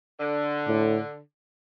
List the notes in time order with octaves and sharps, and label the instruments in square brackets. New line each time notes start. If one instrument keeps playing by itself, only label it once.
[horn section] D3
[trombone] A2